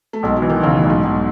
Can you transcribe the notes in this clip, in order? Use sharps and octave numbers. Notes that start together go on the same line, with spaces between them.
A3
B1 G#3
F#3
E3
D#3
B1 C#3
A2
B1
G#2
B1